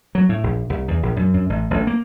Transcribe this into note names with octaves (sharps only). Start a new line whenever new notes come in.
F#3
A2
A#1
C2
E2
A#1
F#2
F#2
A1
A1
A#3